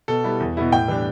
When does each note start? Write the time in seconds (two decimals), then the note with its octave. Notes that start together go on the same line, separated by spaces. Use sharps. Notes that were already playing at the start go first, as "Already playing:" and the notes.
0.08 B2 A4
0.24 G3 B3 E4
0.40 E2
0.57 B2 B3 E4
0.72 A2 G5
0.88 E3 G3 D4